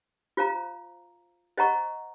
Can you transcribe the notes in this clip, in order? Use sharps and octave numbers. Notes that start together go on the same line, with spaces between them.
F4 C5 F5 A#5
C5 D#5 F#5 A#5 C#6